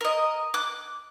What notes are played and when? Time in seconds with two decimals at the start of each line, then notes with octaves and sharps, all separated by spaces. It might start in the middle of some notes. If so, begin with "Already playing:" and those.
0.01 A#4 D#5
0.54 D6 F#6